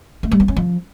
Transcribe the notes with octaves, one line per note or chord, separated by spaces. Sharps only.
A3
G3
B3
C#4
F3